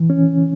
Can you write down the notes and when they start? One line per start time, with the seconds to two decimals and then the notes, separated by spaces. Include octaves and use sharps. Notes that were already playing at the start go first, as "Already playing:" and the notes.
Already playing: E3
0.10 C#4